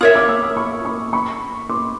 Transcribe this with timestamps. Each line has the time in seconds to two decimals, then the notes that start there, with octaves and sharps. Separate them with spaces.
0.01 F4 A#4 C#5 E5 D#6 F6
0.15 D6 E6
0.29 D6 E6
0.43 D#6 F6
0.57 B5 C#6
0.85 B5 C#6
1.13 B5 C#6
1.70 C6 D6